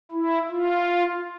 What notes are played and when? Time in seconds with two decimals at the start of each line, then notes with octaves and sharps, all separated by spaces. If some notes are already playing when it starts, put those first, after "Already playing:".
0.12 E4
0.49 F4